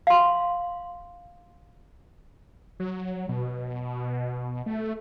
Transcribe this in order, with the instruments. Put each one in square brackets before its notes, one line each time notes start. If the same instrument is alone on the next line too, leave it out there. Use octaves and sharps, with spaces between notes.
[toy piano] F5 C6
[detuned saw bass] F#3
B2
A3